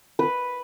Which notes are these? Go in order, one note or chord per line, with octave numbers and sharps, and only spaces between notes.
B4